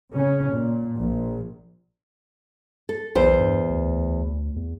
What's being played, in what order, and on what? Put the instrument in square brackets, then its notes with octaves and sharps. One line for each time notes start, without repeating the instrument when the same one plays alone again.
[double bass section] C#3 C#4
A#2
A#1
[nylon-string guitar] A4
[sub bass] B1 [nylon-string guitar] E2 C5
[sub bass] G2
D2
E2